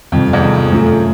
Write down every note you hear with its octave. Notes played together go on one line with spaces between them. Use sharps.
F2 C3 D#3 G3 C4
E2
F2
F2
F#2 A3 C#4 F4 G#4